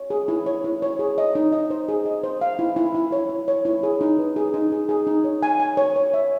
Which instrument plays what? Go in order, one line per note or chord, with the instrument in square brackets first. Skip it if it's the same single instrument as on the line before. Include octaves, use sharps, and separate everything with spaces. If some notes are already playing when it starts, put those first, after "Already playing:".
Already playing: [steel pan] C#5
G#4
E4
C#5
E4
C#5
G#4
D#5
D#4
D#5
C5
G#4
D#5
C5
F5
E4
E4
E4
C#5
E4
C#5
E4
G#4
D#4
B4
G#4
D#4
G#4
G#4
D#4
C#5
G#5
G#5
C#5
C#5
E5